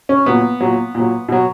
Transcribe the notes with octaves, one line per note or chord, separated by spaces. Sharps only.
C#4
A#2 F#3 B3
A#2 F#3
A#2 F#3
B2 F#3